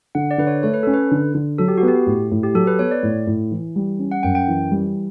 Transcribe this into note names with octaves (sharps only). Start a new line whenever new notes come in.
D3 F#5
D5
D3 B4
C#5
A3 C#5
B4
C#4 A4
B4
D3
D3
F#3 A4
G4
F#4
B3
G4
A2
A2
G4
F#3 A4
B4
B3 C#5
D5
A2
A2
E3
G3
C#4
F#5
F#2 G5
G5
E3
G3